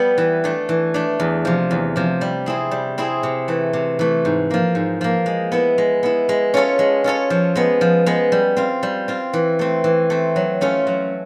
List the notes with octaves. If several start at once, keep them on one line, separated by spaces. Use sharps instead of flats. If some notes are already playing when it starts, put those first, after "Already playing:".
Already playing: G3 B3
E3
A3 D4
E3
A3 D4
E2
C3 F3
E2
C3 F3
G3
C4 E4 G#4
G3
C4 E4 G#4
C3
E3 A3
C3
E3 A3
G#2
F3 A#3
G#2
F3 A#3
G#3
B3 E4
G#3
B3 E4
G#3
C#4 F4 A4 C#5
G#3
C#4 F4 A4 C#5
F3
G#3 B3
F3
G#3 B3
G3
C4 F4
G3
C4 F4
E3
A3 C4
E3
A3 C4
F#3
A3 C#4 F4 A4
F#3